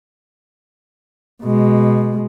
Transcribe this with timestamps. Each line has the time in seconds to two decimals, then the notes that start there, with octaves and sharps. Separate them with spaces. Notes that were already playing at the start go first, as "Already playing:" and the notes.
1.44 B2 G#3